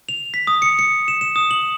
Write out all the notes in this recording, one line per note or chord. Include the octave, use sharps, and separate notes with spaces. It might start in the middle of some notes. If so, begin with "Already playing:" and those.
F7
B6
D#6
C#7
C#7
E7
E7
D#6
F#7